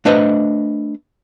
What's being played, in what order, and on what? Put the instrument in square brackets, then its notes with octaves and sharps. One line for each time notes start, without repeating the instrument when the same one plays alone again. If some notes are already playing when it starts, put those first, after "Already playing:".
[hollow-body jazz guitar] A3 D4 B4 C5 D#5